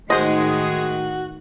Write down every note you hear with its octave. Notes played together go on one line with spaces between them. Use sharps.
A2 D#3 G#3 F#4 G#4 C5 D#5